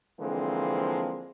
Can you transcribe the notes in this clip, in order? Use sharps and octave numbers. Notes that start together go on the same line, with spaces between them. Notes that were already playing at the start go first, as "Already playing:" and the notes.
D3 E3 F3 G#3 A#3 C4